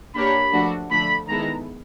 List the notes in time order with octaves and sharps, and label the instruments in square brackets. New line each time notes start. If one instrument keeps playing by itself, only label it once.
[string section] A#3 D4 G4 A#4 C#5 [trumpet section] B5
[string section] F3 A3 D4 F#4
[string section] D3 F3 A3 D4 [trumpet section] B5
[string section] D#3 G#3 B3 E4 A4 [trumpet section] A#5